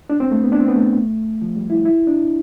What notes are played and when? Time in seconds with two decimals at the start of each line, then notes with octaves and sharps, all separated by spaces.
0.10 D4
0.20 C4
0.31 A3
0.43 B3
0.52 D4
0.60 C4
0.68 B3
0.76 A3
1.42 F3
1.56 G3
1.70 E4
1.85 E4
2.07 D4